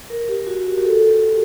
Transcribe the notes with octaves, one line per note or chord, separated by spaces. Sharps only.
A#4
G4
F#4
G4
G4
A4
G4